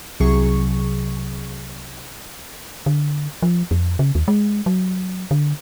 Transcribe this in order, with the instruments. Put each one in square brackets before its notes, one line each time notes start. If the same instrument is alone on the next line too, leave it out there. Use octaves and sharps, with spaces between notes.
[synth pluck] C2 C3 F#3 G#4 C#6
[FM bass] D3
F3
F2
C#3
D#2
G#3
F#3
D3